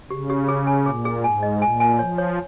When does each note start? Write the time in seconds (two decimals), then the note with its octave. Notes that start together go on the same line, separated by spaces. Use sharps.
0.10 C#3 G4
0.30 G4
0.48 G#4
0.67 G#5
0.86 A#2 G#4
1.05 G#4
1.24 G#2 G#5
1.43 D#5
1.61 A#2 G#5
1.80 G#5
1.99 F3 C#5
2.18 C#5